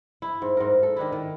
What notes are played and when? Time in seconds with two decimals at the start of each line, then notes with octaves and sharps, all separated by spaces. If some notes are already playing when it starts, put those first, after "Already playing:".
0.22 E4
0.42 G#2
0.57 G#2 A#4
0.83 A4
0.97 D#3 D4 E4
1.12 D#3